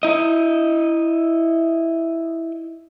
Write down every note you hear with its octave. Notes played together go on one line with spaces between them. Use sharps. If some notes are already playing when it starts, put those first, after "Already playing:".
E4 D#5